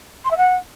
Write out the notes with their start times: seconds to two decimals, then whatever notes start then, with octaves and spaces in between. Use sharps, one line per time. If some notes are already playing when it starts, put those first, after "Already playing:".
0.24 C6
0.30 E5
0.37 F#5